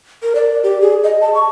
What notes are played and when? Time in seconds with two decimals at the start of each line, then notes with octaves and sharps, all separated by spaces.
0.23 A#4
0.35 D5
0.63 G4
0.82 G#4
1.04 D#5
1.22 A5
1.34 C#6